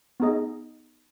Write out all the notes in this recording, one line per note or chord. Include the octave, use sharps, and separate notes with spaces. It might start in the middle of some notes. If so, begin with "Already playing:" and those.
B3 D#4 G#4 D#5